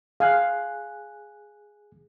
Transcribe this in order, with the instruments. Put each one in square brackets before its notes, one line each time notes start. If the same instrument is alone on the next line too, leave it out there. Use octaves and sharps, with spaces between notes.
[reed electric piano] G#4 G#5 F#6 [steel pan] F5